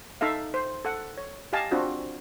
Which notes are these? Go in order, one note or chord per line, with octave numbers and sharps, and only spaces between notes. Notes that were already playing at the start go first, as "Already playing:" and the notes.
D#4 A4 E5 F5
C5
A4 F#5
C#5
G4 D#5 F5 G#5 A5
C4 D4 F4 F#4